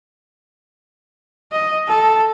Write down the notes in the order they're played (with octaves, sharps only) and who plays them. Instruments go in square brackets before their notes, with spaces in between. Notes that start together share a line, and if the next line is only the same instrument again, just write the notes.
[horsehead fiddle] D#5
A4